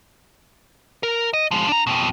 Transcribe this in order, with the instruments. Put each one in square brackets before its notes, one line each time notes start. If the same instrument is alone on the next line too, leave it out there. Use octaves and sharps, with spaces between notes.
[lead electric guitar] A#4
D#5
F3 G#3
D4 A#5
F2 B2